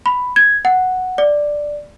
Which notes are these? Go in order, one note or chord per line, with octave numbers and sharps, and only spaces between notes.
B5
G#6
F#5
D5